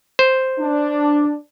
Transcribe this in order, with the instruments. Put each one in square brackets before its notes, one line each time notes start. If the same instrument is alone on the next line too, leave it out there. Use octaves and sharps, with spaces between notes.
[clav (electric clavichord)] C5
[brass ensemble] D4